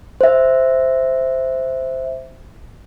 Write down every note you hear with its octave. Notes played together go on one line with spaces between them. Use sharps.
C5 E5